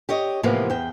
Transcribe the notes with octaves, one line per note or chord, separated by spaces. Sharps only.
G4 C#5 D#5
A2 C3 E3 F3 A#3 B3
E2 G5